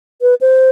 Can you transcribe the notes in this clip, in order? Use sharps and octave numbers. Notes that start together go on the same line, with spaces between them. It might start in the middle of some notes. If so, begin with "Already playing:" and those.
B4
C5